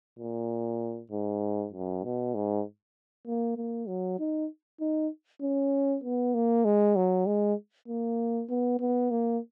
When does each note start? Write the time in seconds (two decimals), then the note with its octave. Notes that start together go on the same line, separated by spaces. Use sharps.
0.19 A#2
1.11 G#2
1.73 F#2
2.04 B2
2.35 G#2
3.27 A#3
3.57 A#3
3.88 F#3
4.19 D#4
4.80 D#4
5.42 C#4
6.04 B3
6.34 A#3
6.65 G#3
6.96 F#3
7.26 G#3
7.88 A#3
8.49 B3
8.80 B3
9.11 A#3